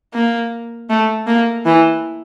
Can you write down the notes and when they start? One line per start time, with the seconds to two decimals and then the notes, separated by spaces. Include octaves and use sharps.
0.14 A#3
0.90 A3
1.27 A#3
1.66 E3